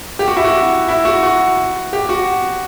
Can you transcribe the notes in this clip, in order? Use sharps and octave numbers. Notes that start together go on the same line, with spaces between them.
G4
F#4
E4
F#4
E4
F#4
F#4
G4
F#4